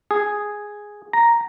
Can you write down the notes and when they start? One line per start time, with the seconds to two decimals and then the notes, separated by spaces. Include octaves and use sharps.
0.11 G#4
1.13 A#5